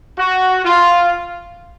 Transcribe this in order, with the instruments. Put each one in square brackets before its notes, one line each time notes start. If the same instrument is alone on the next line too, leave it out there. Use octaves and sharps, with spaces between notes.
[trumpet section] F#4
F4